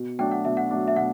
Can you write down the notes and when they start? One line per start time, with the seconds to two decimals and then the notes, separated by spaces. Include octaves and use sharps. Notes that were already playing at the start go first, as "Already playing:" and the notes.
Already playing: B2
0.19 F#3 A3 D4 G5
0.32 F#5
0.45 B2 E5
0.57 F#5
0.71 F#3 A3 D4
0.88 E5
0.96 B2 F#5